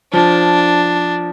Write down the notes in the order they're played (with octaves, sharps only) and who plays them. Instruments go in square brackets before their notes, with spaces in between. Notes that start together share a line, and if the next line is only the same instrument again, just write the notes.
[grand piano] F3 [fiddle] D4